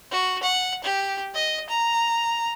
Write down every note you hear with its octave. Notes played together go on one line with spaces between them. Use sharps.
F#4
F#5
G4
D#5
A#5